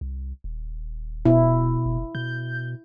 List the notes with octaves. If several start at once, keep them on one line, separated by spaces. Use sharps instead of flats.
C2
D#1
B2 E4
F#1
B2 G6